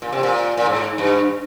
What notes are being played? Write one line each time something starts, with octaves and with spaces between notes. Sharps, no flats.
A#2
C3
A#2
A#2
G#2
G2